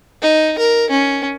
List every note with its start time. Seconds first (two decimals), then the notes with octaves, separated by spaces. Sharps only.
0.22 D#4
0.58 A#4
0.90 C#4